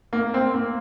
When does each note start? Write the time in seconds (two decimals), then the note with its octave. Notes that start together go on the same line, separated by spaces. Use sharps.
0.13 A#3
0.34 C4
0.54 A#3